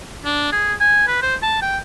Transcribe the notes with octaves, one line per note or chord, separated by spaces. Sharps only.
D4
G#4
G#5
B4
C5
A5
G5